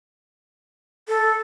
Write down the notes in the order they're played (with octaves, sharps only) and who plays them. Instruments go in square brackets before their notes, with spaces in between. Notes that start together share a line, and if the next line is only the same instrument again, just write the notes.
[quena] A4